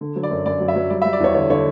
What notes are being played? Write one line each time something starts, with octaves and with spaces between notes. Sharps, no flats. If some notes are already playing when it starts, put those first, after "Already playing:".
D3
F#3
D5
F#2
F#2 D5
F#3
E5
F#3
G3 D5
E5
G3
D5
E2 C#5
D3 C#5
D3 C#5